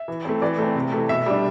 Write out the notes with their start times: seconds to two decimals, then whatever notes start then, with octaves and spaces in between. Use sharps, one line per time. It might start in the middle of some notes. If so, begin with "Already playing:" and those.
Already playing: E5
0.08 E3
0.25 A3 C4
0.42 E3 D5
0.59 A3 C4
0.75 C3
0.92 E3 A3
1.09 B2 E5
1.26 G3 D4